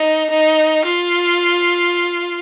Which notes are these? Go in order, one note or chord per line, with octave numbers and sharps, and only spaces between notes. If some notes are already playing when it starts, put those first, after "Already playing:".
Already playing: D#4
D#4
F4